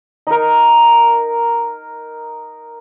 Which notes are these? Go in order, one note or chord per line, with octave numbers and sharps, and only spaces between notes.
D#4 A#4